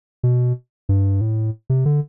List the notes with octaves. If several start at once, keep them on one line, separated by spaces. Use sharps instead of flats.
B2
G2
A2
C3
D3